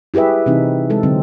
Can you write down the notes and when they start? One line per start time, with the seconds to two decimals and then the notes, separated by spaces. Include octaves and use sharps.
0.14 E4 G4 G#4 B4 E5
0.46 C3 E3 C4 D#4
0.90 G#3 A4
1.03 D3 F#3 C4